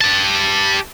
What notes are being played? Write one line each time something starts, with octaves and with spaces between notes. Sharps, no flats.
G4 A5